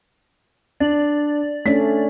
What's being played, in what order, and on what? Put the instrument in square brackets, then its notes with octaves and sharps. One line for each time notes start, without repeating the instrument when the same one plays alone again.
[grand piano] D4 [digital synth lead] D5
[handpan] A3 C#4 D4 [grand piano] B6